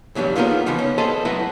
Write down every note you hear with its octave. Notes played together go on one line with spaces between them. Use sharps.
G2 B2 E3 F#3 G3
A#3 B3 D#4 F4 G#4 A#4
C#3 E3 F3 B3 D#4
B3 C#4
B3 G#4 A4 C5 D#5
F#3 A3 E4 B4 D#5 F#5